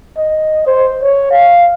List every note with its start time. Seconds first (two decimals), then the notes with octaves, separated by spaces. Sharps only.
0.18 D#5
0.67 C5
1.02 C#5
1.31 F5